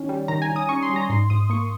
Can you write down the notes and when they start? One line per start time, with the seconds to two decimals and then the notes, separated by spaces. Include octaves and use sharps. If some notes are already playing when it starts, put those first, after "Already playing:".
Already playing: D#3 C#4
0.09 G3
0.28 D#3 A#5
0.42 G#5
0.48 D#3
0.56 D#6
0.69 C#4 C#6
0.82 C6
0.89 G3
0.96 A#5
1.09 G#2 C6
1.30 G#2 D#6
1.50 A#3 C#6